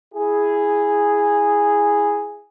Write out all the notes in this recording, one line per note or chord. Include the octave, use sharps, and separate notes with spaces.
E4 G#4